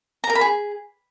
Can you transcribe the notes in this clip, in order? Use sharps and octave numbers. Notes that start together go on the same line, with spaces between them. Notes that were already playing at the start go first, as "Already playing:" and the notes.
A#5
A#4
B5
G#4